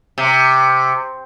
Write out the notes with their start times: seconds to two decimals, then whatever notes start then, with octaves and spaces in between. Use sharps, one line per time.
0.18 C3